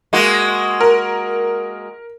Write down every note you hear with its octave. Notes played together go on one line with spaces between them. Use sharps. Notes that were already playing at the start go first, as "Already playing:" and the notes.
G#3 A#3 F#4
A#4